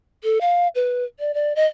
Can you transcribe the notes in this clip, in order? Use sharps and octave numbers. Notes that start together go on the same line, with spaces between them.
A4
F5
B4
D5
D5
D#5